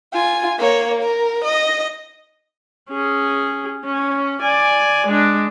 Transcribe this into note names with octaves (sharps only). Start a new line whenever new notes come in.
F4 G#5
A#3 C#5
A#4
D#5
C#4 G#4
C#4
D5 G#5
G#3 D4